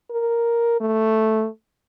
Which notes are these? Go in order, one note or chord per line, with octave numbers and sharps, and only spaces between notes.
A#4
A3